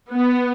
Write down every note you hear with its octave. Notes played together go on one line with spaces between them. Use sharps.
B3